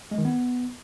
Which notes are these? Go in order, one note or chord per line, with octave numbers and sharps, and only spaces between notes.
G#3
D#3
B3